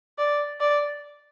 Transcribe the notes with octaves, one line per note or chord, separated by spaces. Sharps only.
D5
D5